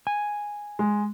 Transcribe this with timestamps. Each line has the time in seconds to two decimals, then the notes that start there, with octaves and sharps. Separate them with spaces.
0.07 G#5
0.79 G#3